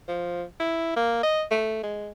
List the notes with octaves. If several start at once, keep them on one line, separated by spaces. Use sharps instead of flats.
F3
E4
A#3
D#5
A3
G#3